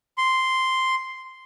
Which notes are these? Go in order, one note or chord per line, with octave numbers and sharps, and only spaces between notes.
C6